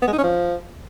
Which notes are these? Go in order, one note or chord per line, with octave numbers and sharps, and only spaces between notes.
B3
G#3
D#4
C#4
F3